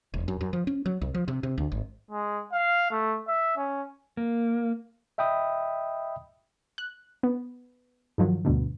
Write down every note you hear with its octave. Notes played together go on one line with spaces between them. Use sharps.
E1
F#2
F#2
F3
C#4
F#3
C2
F3
C3
C3
D2
G#1
G#3
F5
A3
E5
C#4
A#3
D#5 E5 G5 B5 D#6
F#6
B3
G2 D#3 F3 F#3
D2 G2 B2 D3